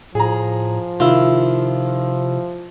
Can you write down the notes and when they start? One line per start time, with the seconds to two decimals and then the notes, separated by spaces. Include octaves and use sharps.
0.15 A2 F3 G#4 A#5
1.00 C3 D#3 E4 F4